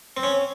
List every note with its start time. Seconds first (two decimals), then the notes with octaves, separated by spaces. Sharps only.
0.17 C4
0.23 C#4